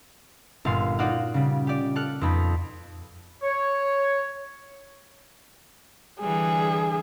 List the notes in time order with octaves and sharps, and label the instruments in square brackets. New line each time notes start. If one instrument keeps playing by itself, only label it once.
[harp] G1 A#2 F5 C6
D#4 F4 F#4 D5 F5 F#5
C#3 G3
G4 D5
A4 F6 F#6 C#7
F2 B3 D#4 B5
[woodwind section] C#5
[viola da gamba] D3 E3 G3 [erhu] G#4